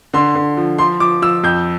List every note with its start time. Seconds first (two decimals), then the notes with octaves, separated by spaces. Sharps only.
0.14 D3 C6
0.35 D3
0.57 F3
0.78 F3 C6
1.00 F3 D6
1.22 F3 E6
1.43 F2 G6